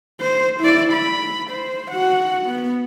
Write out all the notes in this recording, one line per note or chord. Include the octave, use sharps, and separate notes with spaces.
C5
E4 D5
B5
C5
F#4 F#5
B3